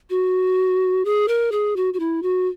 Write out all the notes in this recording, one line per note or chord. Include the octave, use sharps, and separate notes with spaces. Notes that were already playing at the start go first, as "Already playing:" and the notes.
F#4
G#4
A#4
G#4
F#4
F#4
E4
F#4